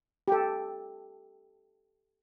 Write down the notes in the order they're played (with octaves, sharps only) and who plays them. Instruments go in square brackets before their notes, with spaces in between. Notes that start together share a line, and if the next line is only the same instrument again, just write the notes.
[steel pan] G4 A4